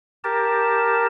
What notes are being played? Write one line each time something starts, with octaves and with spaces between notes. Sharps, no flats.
G4 A#4 A5